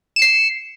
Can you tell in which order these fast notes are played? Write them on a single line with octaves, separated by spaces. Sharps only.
E7 C#7 C7